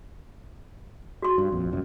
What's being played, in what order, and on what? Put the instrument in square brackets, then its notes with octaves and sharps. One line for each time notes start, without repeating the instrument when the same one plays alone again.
[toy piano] F#4 C6
[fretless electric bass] G2
A#1 F2
F#1 C2 F#2